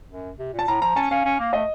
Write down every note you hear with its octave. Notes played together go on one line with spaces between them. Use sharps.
F#2
C3
A#2
A5
A2 A#5
F3 A#5
C#4 A5
C#4 F5
C#4
A#3
A3 D#5